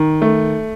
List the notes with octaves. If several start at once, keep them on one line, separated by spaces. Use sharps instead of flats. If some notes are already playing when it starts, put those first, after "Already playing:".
Already playing: D#3
A3